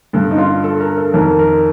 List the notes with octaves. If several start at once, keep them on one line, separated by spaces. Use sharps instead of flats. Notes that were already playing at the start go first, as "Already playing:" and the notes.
G2 D3 A4
D#4
F4
A4
A#4
A4
F2 D#3 A#4
A#4